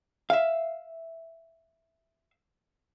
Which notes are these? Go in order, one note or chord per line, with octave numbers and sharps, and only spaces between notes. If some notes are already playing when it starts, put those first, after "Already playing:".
E5 F5